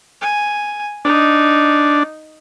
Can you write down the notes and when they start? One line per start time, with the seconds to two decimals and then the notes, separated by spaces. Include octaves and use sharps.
0.21 G#5
1.05 D4 D#4